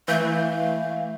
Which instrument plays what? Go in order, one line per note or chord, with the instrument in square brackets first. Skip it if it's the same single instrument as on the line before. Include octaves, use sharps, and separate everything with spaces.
[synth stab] E3 G6 [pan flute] A3 [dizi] F5